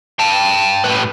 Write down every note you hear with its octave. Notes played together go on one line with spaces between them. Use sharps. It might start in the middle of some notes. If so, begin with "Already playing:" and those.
G5 A5
A2 B4